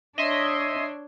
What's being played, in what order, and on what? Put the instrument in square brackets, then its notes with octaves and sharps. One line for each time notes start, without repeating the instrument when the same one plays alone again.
[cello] D4 C#5 [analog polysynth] D#5 E5 C6